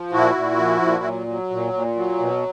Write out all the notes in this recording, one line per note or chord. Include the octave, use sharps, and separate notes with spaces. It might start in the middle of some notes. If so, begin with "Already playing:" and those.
Already playing: F3
A#2 E4 F#4
A#2
F3
A#2
F#3
F#3
A#2
A#2
F#3
B2